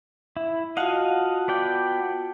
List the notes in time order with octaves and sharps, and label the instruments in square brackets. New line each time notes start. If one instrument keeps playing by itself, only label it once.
[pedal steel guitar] E4
[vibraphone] F4 F#4 A5 [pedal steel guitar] D#5 F5 F#5
[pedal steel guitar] B3 D5 G5